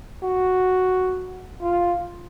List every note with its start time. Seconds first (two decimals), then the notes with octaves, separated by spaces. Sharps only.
0.23 F#4
1.62 F4